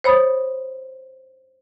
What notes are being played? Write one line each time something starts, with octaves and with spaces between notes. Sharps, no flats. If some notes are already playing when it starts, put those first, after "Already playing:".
C5 C#5 B5 D#6 A6